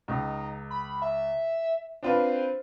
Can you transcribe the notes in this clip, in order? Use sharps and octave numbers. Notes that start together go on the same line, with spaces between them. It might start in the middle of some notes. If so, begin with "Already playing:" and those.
C#2 D#4
B5
E5
C4 D4 F4 B4